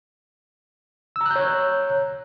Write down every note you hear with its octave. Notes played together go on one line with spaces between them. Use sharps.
C#5 A#5 E6 F#6 G6